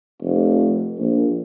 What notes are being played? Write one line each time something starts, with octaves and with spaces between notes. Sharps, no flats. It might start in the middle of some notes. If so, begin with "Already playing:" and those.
F1
A#1